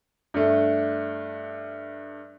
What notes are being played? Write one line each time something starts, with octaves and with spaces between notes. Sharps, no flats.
G2 A3